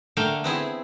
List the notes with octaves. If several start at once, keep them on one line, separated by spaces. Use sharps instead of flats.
D3 A3 A#3 F5 G5
B3 C4 E4 G#4